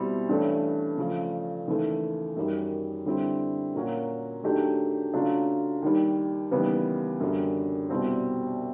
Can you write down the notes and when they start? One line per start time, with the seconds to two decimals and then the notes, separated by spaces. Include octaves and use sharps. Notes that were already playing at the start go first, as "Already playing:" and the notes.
Already playing: B2 G3 C4 E4
0.29 G2 E3 A3 C#4
0.97 C#3 F3 A3
1.67 D#2 C#3 E3 A3
2.36 F#2 D#3 G3
3.06 D3 G3 C4 E4
3.75 A#2 F#3 A#3 C#4 F#4
4.43 D#3 F#3 A3 D4 G4
5.13 C#3 F#3 A3 D4 F4
5.82 D#2 D#3 G3
6.51 D#2 C#3 E3 G3 B3
7.20 F#2 D3 G3
7.90 C2 B2 G3 C4